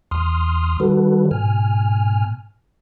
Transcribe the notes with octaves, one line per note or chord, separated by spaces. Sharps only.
E2 C6 D#6 F6
D#3 G3 F#4 A4 B4
G#2 B2 G#5 F6